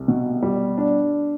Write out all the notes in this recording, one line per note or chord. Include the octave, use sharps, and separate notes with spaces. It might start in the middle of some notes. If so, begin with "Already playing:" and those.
Already playing: C2
B2
G3
D4